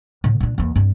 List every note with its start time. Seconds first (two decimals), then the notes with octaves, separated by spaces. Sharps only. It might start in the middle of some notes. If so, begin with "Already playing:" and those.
0.24 A2 D3
0.40 A#2 D4
0.58 E2 A#3
0.76 G2 C4